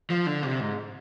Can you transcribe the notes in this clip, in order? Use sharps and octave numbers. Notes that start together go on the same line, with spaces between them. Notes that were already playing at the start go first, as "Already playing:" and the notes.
F3
D3
C3
G#2